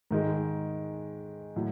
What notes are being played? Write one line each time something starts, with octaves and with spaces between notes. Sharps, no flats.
G#2 D#3 G#3
A2 F#3